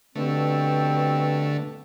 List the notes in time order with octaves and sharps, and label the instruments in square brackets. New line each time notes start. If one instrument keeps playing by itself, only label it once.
[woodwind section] G2 B2 C4 [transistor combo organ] D3 A3